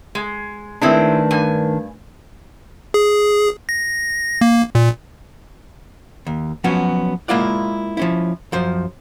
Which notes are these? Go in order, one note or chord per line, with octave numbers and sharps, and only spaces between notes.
G#3
D#3 G#3 A3 C4 D4 E4 A#4 B4
G2 G#5
G#4
A#6
A#3
A#2
D#2
F3 F#3 B3 C#4 F#4
G#3 A#3 E4 F4 D5 F#5
F3 C#4 E4
F#2 F3 C5